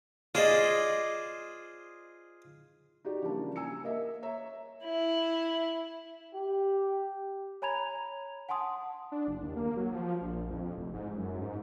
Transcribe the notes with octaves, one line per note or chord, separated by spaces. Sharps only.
F4 G#4 C5 D5 D#5
D#4 F#4 G4 D5
C#3 E3 F3 G3 A#3 D4
G#5 E6 C#7
A#3 A#4 D#5 E5
C#5 E5 A#5
E4
G4
C#5 G#5 A#5 B5 G#6 F7
F#5 G#5 A5 C6 D#6
D4
F#1
D#2
A#3
F#3
F3
A#1
F2
F1
G#2
F#2
G#2